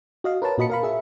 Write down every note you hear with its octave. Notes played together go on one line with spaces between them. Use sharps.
F#4 D#5 F5
A#4 B4 C#5 A5
A#2 F#4 D#5 B5 C#7
A#4 F5 B5
G#4 E5